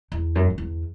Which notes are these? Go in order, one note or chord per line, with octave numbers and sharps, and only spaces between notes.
E2
F#2
F#2
E2